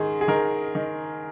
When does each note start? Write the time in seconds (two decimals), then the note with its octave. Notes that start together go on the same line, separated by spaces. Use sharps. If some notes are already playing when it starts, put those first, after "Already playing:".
Already playing: G#2 D#3 G#4
0.21 G#4
0.28 D#3 A#4
0.75 D#3